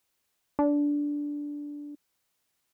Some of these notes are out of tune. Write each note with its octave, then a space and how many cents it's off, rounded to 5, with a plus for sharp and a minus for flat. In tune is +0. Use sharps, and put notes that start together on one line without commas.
D4 -10